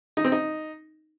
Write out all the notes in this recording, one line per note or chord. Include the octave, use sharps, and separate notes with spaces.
D#4
C4
D#4